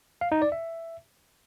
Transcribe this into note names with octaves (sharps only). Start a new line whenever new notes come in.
F5
D#4
D5
E5